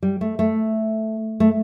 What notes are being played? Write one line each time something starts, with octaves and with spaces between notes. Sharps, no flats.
G3
A3
A3
A3